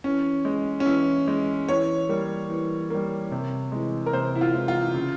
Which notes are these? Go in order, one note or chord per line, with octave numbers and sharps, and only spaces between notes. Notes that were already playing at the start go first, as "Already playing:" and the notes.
E3 C#4
G#3
C#4
E3 E4
G#3
E3 C#5
G3 A#3
E3
G3 A#3
C3
E3 G#3
A#4
C3 C5
E4
F4
E3 G#3
F4
C#3